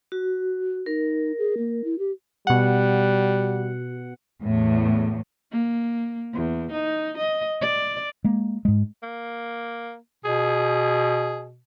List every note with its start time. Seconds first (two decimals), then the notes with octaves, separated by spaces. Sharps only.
0.12 F#4
0.86 D#4 A#4
1.38 G#4
1.58 A#3
1.84 E4
1.99 G4
2.47 B2 G3 F#5
4.42 E2 A2
5.52 A#3
6.33 E2
6.71 D#4
7.17 D#5
7.61 D5
8.24 G#3 A#3
8.65 G#2 G#3
9.03 A#3
10.25 B2 G#4